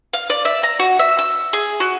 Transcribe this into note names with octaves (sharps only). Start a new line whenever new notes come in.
F5
D5
E5
A#5
F#4
E5
E6
G#4
F#4